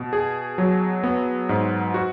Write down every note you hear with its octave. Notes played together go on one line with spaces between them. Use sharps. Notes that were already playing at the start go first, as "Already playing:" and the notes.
Already playing: B2
G#4
F#3
B3
G#2
F#4